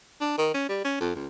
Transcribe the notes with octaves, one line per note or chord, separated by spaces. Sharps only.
D4
D#3
C#4
G3
C#4
F2
C#2